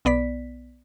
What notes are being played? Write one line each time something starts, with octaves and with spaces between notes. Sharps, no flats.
B1 B3 D5 B6